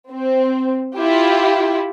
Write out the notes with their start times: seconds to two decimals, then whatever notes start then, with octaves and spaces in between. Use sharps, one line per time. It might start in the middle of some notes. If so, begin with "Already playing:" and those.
0.11 C4
0.95 E4 F4 G4